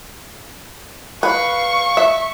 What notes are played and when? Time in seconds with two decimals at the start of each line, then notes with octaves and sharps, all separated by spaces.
1.23 B4 F5 C#6
1.97 E5